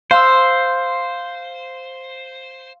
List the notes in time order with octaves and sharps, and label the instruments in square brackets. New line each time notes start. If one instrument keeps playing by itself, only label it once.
[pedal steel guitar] C5 [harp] F5 C6 E6